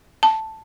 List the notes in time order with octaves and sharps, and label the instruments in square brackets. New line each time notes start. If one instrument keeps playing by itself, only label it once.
[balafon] A5